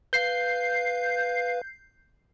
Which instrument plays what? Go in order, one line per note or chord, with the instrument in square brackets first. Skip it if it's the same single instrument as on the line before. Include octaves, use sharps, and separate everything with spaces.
[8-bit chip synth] B4 F5 [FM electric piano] G6 C7